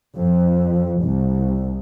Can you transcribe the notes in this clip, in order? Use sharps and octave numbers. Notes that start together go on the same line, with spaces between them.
F2
C2